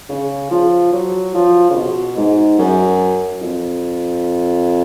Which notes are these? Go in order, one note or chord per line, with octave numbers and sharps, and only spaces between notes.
C#3
F3
F#3
F3
C#3
B2
G#2
F#2
F2